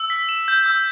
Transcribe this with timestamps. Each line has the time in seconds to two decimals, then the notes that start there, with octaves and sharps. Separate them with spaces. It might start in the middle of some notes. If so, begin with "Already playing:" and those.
Already playing: E6
0.10 B6
0.29 E7
0.48 G6
0.66 E6